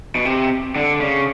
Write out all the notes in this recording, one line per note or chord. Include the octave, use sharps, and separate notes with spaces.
B2
C3
D3
C#3